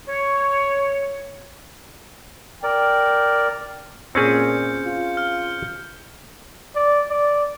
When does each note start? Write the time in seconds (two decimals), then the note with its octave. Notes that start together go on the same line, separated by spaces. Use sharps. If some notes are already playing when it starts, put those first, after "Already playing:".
0.08 C#5
2.63 A#4 D5 G5
4.15 A#2 C4 C#4 G#4 G6 C#7
4.86 F4
5.17 F6
6.75 D5
7.10 D5